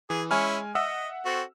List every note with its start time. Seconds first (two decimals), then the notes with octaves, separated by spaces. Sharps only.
0.10 E3 G#4
0.31 G#3 C#4 E4 G#5 C#6 F6
0.75 D#5 E5 F#5 E6
1.26 C4 F#4 A4